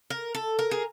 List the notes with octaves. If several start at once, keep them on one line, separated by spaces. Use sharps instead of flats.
A#4
A4
A#4
G#4